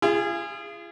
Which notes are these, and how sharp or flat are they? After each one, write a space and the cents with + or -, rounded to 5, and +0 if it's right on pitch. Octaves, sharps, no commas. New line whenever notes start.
F4 -40 G#4 -15